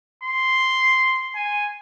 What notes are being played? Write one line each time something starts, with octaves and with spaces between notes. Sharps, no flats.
C6
G#5